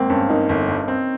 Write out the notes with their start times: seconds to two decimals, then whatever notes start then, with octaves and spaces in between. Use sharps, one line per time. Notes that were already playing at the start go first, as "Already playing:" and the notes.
Already playing: G#1 A#3 C4
0.10 G2 C#4
0.30 A#3 D#4
0.49 G1
0.68 G2
0.88 C4